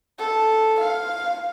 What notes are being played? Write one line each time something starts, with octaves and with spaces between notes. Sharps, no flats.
A4
F5